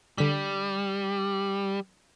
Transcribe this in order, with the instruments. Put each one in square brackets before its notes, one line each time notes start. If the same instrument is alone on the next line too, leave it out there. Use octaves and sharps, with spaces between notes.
[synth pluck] D3 B6 [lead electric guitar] G3